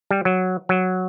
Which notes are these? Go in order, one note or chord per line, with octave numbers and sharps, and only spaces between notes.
G3
F#3
F#3